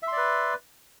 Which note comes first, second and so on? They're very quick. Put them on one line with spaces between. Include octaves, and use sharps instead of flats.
E5 C6 D5 B4